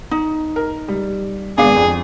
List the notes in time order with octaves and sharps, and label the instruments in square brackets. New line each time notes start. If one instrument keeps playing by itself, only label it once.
[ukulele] D#4
[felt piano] A#4
G3
[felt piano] G#1 B3 C7 [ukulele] D4 F5 [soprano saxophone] G#4
[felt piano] F2